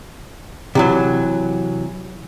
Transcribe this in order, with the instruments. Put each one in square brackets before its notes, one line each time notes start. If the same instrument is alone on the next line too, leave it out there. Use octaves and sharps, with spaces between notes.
[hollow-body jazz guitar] C3 E3 F#3